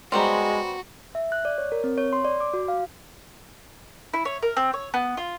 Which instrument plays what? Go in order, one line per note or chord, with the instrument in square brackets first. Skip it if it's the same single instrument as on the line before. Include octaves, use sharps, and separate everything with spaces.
[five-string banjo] G3 B3 C5 [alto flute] G#3 [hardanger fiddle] F#4 [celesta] A#5 C6
[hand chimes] E5
F#6
D5
C#5
A#4
C4
C#5
C6
D5
D6
F#4
F5
[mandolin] E4
C#5
A#4
C4
C#5
B3
F4